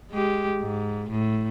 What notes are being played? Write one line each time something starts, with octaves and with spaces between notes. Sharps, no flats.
G#3 G4
G#2
A2